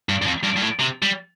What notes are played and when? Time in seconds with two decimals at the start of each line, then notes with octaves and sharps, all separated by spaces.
0.09 G2
0.22 G2
0.26 F2
0.43 G2
0.56 G2
0.62 A2
0.79 C3
1.02 G3